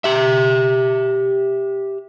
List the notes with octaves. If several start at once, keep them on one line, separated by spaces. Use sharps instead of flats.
G4 E5